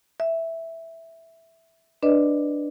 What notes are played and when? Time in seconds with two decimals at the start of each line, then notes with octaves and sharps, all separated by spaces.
0.20 E5
2.03 D4 B4 D5 D#5